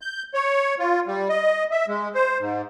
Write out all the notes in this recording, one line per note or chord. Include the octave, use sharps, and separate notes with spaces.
G6
C#5
F4
G3
D#5
E5
G#3
C5
G#2